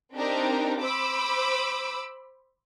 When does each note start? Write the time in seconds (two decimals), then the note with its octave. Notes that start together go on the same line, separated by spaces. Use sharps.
0.15 C4 D4 D#4 G4 A#4
0.82 C5 B5 D6 E6